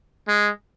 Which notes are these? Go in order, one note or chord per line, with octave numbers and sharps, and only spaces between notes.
G#3